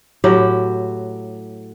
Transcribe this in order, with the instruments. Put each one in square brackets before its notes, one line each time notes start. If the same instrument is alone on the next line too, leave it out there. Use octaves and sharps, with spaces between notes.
[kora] A2 F#3 G4